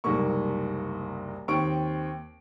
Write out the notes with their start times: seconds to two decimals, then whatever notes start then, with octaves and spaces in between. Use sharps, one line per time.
0.04 F#1 C2 G#2 A#3 C#6
1.48 D#2 C4 C#6 D7